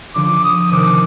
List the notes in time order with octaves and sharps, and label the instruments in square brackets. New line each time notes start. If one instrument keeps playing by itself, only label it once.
[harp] D3 F3 [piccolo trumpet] D6
[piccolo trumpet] D#6
[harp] C3 D#3 [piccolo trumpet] D6